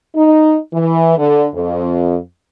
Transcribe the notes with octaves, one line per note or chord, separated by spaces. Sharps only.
D#4
E3
D3
F2